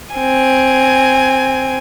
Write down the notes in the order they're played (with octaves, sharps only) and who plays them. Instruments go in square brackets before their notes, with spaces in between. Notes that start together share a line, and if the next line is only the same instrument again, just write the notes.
[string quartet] C4 G#5